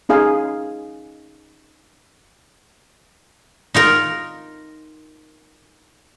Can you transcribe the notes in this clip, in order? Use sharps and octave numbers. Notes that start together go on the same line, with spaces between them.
C#4 D#4 G#4 F5
D#4 F4 A#4